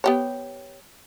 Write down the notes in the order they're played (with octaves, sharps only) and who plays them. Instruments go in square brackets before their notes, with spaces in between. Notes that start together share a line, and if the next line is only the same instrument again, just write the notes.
[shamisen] B3 G4 C#5